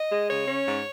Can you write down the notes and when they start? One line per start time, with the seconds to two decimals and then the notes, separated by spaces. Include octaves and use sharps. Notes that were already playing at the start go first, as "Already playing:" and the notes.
Already playing: D#5
0.12 G#3
0.30 C#3 C#5
0.48 C#4
0.67 G#2